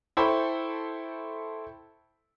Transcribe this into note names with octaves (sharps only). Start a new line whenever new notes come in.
E4 A4 C5 G5 B5 C#6